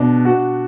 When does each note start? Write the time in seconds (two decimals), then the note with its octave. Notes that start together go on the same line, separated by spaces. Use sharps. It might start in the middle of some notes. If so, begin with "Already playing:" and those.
Already playing: B2 B3 D4
0.25 F#4